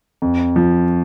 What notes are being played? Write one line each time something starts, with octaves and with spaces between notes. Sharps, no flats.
F2
F3